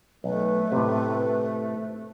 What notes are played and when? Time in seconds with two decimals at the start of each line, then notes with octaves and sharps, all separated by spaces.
0.24 B1 A3 B4
0.72 A2 C3